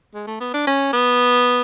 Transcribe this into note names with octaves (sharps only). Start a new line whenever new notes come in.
G#3
A3
B3
D4
C#4
B3